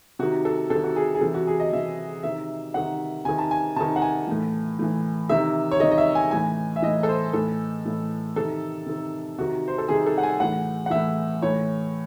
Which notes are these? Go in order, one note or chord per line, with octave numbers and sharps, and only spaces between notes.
C3 D#3 F#4
A4
C3 A4
D#3
F#4
G#4
G#4
C3 E3 A4
F#4
G#4
D#5
C3 E3 E5
C3 D#3 E5
C3 D#3 F#5
C3 D#3 G#5
A5
G#5
C3 D#3 A5
F#5
G#5
A2 E3
A2 E3
C3 D#3 E5
C#5
C3 D#3 D#5
D#5
E5
G#5
A2 E3 G#5
E5
A2 E3 D#5
A4
C5
A2 E3 A4
A2 E3
C3 D#3 A4
C3 D#3
C3 D#3 F#4
C5
A4
C3 D#3 G#4
A4
F#5
G#5
A2 E3 F#5
F#5
A2 E3 E5
A2 E3 C#5